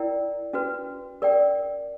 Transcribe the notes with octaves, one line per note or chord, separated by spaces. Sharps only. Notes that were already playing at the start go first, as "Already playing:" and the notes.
Already playing: E4 A#4 D5 G5 A#5
C#4 F#4 B4
A#4 D5 G5